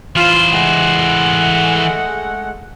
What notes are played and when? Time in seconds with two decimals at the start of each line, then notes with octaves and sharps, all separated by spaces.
0.16 E3 F4 C5
0.53 G#3 A3 F#5